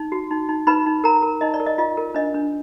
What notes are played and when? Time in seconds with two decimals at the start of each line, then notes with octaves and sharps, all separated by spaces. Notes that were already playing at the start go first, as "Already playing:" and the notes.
Already playing: D#4
0.12 F#4
0.31 D#4
0.49 D#4
0.67 D#4 B4 B5
0.86 D#4
1.04 A#4 A#5
1.22 A#4
1.41 D#4 D#5
1.54 D5
1.60 A#4
1.66 D#5
1.78 F4 D#5
1.97 A#4
2.15 D4 D#5
2.34 D4